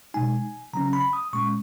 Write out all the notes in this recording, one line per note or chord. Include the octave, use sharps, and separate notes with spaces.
B2 G#3 D#4 G#5
C#3 F#3 C#4 A#5
B5
D#6
A#2 G#3 C#4 C#6